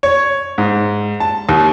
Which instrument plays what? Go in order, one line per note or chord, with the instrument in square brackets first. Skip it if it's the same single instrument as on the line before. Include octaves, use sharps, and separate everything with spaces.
[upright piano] C#5
G#2
A5
D#2